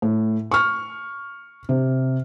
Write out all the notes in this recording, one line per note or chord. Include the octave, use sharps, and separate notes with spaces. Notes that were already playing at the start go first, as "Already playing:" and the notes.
A2
C#6 F6
C3